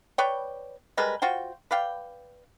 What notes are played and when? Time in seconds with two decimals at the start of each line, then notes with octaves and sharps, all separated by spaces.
0.18 B4 C#5 D5 G5
0.97 G3 G#3 A#4 B4
1.22 F4 F#4 C5 G5
1.71 B4 D5 F5 G5